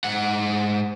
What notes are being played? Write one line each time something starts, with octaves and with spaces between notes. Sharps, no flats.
G#2 F#5